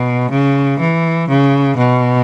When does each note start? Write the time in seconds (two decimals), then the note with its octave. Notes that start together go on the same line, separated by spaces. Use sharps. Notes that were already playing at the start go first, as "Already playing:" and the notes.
Already playing: B2
0.31 C#3
0.80 E3
1.29 C#3
1.77 B2